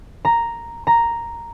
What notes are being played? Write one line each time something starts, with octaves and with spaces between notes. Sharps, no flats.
A#5
A#5